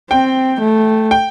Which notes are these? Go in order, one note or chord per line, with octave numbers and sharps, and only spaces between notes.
C4 G5
A3
G5